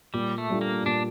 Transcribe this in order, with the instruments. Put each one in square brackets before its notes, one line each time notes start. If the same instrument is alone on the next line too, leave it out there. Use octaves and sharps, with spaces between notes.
[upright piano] A#2 [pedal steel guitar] G3
[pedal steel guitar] A3
[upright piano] G3 D4 F4 A4
[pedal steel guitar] A#3
[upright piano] A#2 [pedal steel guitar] D4